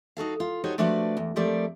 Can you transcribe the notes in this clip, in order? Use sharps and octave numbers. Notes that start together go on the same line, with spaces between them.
D#4 F#4 A4 F5
F4
D#4 F#4 G4 A4 C5 C#5
F3 A3 D4 F#4 B4 D5
E2
F2 F3 G3 A3 A#4 D5